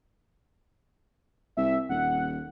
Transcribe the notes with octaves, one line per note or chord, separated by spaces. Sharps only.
C2 E5
D#1 F#5